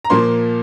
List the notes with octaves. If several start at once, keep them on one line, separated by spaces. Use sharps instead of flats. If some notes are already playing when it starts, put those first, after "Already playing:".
A#5
A#2 F3 A#3 C6